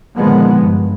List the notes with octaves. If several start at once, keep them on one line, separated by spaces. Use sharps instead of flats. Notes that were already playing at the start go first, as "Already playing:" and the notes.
A#2 D3 D#3 F3 G#3 B3
G2